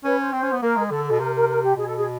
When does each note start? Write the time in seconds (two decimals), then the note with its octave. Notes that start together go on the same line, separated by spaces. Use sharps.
0.04 C#4 B4 C#5
0.18 C5
0.33 C4 C5
0.43 C#4
0.52 B3
0.61 A#3 A#4
0.77 G#3
0.90 D3 A4
1.06 A4
1.11 B2
1.19 C3 A#4
1.33 A#4
1.48 A#4
1.63 G4
1.76 B2 G#4
1.86 A4
1.95 G#4